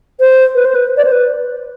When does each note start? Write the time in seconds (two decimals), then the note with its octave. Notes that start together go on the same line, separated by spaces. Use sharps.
0.20 C5
0.55 B4
0.65 C5
0.75 B4
0.97 D5
1.05 C5
1.12 B4